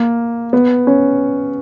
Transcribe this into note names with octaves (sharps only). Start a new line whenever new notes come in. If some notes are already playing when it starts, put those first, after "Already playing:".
Already playing: A#3
B3
C#4